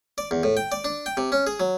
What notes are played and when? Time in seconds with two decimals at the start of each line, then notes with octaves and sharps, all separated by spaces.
0.18 D5
0.31 E2
0.43 A2
0.57 G5
0.72 D5
0.84 D4
1.06 G5
1.17 C3
1.32 C#4
1.47 G#4
1.60 F#3